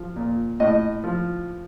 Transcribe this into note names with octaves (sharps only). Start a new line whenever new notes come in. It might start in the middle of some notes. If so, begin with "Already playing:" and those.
Already playing: F3
A#2
A2 D#5
F3